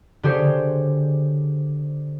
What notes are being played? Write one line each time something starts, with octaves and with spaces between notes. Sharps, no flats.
D3 G4 G#4 C5 C#5